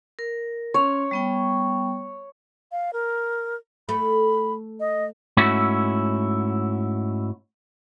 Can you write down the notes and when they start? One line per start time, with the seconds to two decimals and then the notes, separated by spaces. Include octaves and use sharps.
0.19 A#4
0.74 C#4 C#5 C6
1.11 G3 B3 G5
2.72 F5
2.93 A#4
3.89 A3 B5
4.80 D#5
5.37 G#2 A3 C#4 E4 F#4